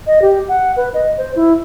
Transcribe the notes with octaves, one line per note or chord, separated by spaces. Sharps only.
D#5
G4
F#5
B4
D#5
C5
E4